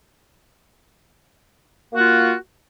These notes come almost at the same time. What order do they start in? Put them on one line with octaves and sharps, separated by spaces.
A#3 F#4 F4